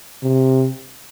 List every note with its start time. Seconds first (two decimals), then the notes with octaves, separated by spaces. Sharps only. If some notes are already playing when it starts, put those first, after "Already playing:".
0.23 C3